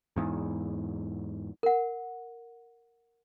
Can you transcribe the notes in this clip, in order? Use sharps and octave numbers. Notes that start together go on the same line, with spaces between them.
E2 G#2
A#4 F#5